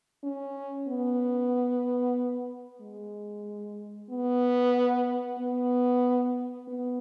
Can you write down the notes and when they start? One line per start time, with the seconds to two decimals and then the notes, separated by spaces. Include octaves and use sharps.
0.24 C#4
0.88 B3
2.81 G#3
4.10 B3
5.39 B3
6.69 B3